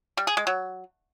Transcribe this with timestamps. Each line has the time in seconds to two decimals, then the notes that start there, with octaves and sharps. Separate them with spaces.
0.17 G3
0.27 G#4
0.37 G#3
0.47 F#3